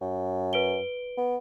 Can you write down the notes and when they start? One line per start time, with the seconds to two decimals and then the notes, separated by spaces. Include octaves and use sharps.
0.01 F#2
0.53 B4 D7 G7
1.17 B3